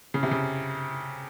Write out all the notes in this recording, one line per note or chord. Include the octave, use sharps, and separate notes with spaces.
C#3
C3
C#3